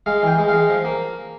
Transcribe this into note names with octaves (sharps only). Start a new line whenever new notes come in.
G#3 F5
E3 G5
G#3
G#3 F5
F3
A#3